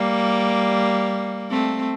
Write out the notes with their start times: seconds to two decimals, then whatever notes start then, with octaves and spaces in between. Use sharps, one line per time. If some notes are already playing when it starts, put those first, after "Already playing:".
Already playing: G3 A#3
1.50 A3 C4